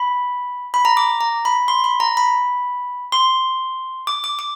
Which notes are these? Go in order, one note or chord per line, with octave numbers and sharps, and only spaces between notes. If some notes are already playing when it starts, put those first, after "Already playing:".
Already playing: B5
B5
A#5
D6
A#5
B5
C6
B5
A#5
B5
C6
D6
D6
D6